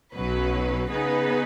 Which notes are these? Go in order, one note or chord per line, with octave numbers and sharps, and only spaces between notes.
B1 B2 F#3 C#4 B4
C#3 B3 D#4 G#4 B4